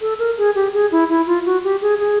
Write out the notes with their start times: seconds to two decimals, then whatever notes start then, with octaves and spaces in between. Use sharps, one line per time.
0.01 A4
0.19 A#4
0.38 G#4
0.55 G4
0.74 G#4
0.92 E4
1.09 E4
1.27 F4
1.46 F#4
1.64 G4
1.82 G#4
1.99 G#4